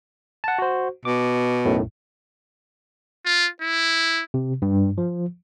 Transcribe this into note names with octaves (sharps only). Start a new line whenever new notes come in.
F#5 A5
F#4 C5
B2 D6
B1 F#2 A2
F4
E4
C3
G2
F3